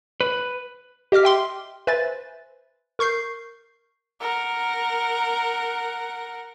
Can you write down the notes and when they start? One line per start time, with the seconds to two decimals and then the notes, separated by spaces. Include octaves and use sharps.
0.21 B4
1.12 G4 D#5 D6 F6 B6
1.23 E5 G5 C6 D6
1.87 B4 C5 E5 G#5 A6
2.99 A#4 C#6 G6 C7
4.21 A#4 F#5